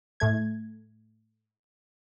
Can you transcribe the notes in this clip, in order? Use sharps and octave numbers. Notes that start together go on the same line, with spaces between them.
A2 A3 G#6